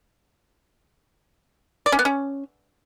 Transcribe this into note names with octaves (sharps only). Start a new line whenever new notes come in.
D5
C#4
B3
C#4